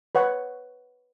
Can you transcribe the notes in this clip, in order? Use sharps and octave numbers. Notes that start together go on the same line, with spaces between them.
B4 C#5 F#5 C#6